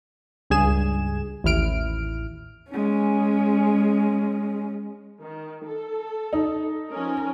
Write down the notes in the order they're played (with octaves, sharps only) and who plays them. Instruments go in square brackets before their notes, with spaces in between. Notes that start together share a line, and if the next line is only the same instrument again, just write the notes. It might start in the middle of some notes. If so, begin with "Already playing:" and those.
[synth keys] C#2 G2 G#4 G#5 E7
A1 D#2 E4 F6 D7
[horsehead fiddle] G#3 C#4
[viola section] D#3
A4
[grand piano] D#4
[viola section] F3 C#4 A#4